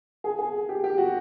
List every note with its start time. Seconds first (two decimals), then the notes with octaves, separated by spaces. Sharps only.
0.24 G#4
0.39 G#4
0.69 G4
0.84 G4
0.98 F#4